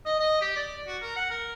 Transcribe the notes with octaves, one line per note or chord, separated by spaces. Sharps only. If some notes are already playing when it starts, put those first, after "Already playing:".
D#5
D#5
G4
D5
F#4
A#4
F#5
A#4